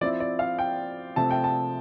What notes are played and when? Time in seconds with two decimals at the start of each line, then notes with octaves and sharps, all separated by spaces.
0.01 F3 C4 E4 D5
0.20 D5
0.39 F5
0.59 G5
1.16 C3 F3 A3 C4 A5
1.31 G5
1.44 A5